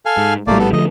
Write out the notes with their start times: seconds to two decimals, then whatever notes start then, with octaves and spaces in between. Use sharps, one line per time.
0.06 A4 F5 G#5
0.17 G#2
0.47 A#1 A2 G3 A3 A#3 D5
0.59 B3 A4
0.73 D3 F3 A3 D#5